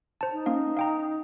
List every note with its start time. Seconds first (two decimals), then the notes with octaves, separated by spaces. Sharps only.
0.21 C5 A5
0.33 D#4
0.46 A#3 C#4 F5
0.77 F5 G5 A#5